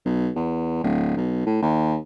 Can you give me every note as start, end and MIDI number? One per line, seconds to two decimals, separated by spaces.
0.06 0.30 35
0.36 0.78 40
0.84 1.13 26
1.17 1.42 35
1.46 1.58 45
1.62 1.96 39